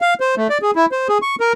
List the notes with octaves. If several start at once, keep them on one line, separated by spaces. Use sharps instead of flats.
F5
C5
A3
D5
G#4
E4
C5
G#4
C#6
A#4